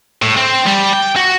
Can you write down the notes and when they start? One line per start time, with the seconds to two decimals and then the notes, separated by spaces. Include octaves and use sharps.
0.22 A2
0.36 C4
0.66 G3
0.93 G5
1.16 F#4